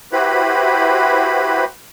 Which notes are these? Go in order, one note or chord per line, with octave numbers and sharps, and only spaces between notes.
E4 F#4 G4 B4 C5 B5